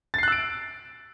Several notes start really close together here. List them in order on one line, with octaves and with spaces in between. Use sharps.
A6 C7 F#6 E6 D7